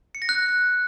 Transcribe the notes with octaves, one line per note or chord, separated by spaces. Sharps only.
C#7
A#6
F#6